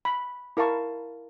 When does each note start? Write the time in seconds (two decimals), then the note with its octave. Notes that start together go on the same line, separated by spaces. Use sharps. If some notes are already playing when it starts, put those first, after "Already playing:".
0.05 B5
0.57 E4 A#4 F5 A5 C#6